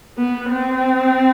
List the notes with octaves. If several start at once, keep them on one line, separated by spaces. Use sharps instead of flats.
B3
C4